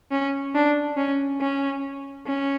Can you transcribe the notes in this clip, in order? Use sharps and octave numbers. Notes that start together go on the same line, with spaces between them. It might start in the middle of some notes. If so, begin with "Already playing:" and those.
C#4
D4
C#4
C#4
C#4